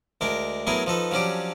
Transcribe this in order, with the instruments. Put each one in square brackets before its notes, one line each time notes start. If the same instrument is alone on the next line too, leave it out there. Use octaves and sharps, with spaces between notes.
[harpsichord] D2 G#3 D4 A#4
F#3 A3 B3 E4 G#4 A#4
F3 D#4 A4 B4
F3 F#3 C#4 D4 G4